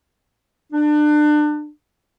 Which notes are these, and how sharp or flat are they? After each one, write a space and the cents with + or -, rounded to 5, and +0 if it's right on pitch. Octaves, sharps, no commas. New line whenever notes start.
D4 +30